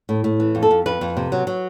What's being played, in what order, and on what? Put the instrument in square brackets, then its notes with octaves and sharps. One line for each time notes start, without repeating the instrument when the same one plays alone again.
[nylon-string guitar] A2
A2
E3
F2
A4
F2
F2 B4
F2
C3
F#3
F#3